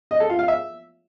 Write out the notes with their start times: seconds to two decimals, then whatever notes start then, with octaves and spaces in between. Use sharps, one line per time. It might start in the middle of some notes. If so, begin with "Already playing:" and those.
0.11 D#5
0.20 A4
0.30 F4
0.39 F5
0.48 E5